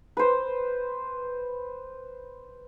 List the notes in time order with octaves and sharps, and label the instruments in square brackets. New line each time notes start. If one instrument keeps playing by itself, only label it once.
[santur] B4 C5